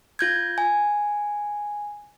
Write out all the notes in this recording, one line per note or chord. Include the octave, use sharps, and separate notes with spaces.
F4 G6 G#6
G#5